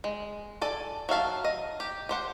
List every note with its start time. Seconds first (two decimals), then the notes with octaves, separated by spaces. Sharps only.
0.04 G#3
0.61 A4 D5 G#5
1.09 F#3 E5 F5 A5
1.44 D#5
1.80 G4
2.09 G4 C5 F#5